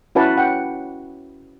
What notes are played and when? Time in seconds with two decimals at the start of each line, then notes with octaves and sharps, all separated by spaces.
0.15 C#4 E4 F#4 B4 F#5 A5
0.38 F#5 G5